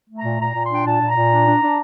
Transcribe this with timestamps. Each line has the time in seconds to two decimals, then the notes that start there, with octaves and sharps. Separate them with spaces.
0.09 A3
0.17 A#5
0.24 A#2
0.40 A#2 A#5
0.55 A#2
0.63 C6
0.70 D4 G5
0.86 A#2 A5
1.01 A#2
1.09 A#5
1.16 A#2
1.31 D4
1.47 D4
1.62 D4